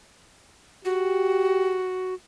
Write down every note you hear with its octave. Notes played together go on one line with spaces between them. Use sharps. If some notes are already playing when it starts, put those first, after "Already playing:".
F#4 G4